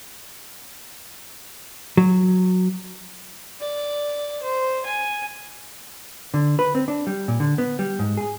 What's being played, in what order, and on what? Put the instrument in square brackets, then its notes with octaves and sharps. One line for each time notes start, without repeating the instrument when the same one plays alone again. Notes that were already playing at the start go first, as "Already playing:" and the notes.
[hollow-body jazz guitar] F#3
[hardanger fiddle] D5
C5
G#5
[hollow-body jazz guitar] D3
B4
C4
D4
G3
A#2
D3
B3
G3
G#2
G#4